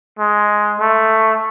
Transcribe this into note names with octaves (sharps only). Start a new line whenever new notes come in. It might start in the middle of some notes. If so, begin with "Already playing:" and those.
G#3
A3